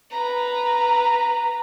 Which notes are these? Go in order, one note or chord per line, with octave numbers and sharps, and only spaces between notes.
B4 A#5